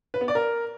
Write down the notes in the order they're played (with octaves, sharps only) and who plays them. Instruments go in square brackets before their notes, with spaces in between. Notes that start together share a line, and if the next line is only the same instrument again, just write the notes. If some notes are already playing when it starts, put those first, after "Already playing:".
[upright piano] B4
B3
D5
A#4